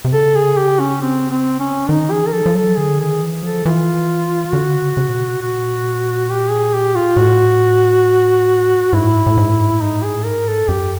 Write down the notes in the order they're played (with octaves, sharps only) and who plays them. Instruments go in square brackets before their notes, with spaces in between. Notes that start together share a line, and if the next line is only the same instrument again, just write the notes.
[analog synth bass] C3
[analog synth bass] C#3 [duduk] A4
[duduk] G#4
G4
C#4
C4
C4
C#4
[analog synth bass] D#3 [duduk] D#4
[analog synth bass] E3 [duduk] G#4
[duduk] A#4
[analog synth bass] F3 [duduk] A4
[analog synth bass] F3
[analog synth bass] F#3 [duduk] A4
[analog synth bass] D3 [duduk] G#4
[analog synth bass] D#3 [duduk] G#4
[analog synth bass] E3
[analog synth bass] F3 [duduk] A4
[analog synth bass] E3 [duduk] F4
[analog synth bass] D3 [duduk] F#4
[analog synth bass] C#3
C#3
A#2
B2
[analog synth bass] A#2 [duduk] F#4
[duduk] G4
G#4
G4
F4
[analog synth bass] A2 [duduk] F#4
[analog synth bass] G#2 [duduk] E4
[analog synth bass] A2
G#2
A2
G#2
A2
G#2
A2
[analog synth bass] G#2 [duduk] D#4
[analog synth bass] A2
[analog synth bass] G#2 [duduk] G#4
[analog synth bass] A2
[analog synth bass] G#2 [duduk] A#4
[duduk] A4
[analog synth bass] G2
[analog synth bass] F#2 [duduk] G4